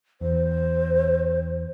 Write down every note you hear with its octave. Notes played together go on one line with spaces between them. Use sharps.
E2 C5